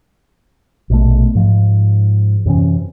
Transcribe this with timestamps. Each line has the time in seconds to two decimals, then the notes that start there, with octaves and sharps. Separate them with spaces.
0.90 A#1 B2 A3
1.35 G#2 F3
2.46 F#2 C3 E3 C#4